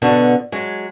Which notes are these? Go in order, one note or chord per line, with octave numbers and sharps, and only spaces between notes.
B2 D3 F#4
F#3 G#3